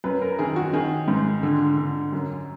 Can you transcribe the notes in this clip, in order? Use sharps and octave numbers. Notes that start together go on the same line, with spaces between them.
F#2 B4
A#4
D#3 G#4
F#4
D#3 G#4
G#2
D3
D3
F#2